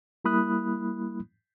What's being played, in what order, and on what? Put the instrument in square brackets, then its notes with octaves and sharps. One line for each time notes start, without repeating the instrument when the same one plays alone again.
[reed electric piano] G3 A#3 E4 B5 D#6 F#6